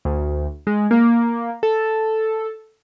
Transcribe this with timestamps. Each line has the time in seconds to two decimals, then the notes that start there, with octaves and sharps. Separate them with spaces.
0.05 D2
0.67 G#3
0.91 A#3
1.63 A4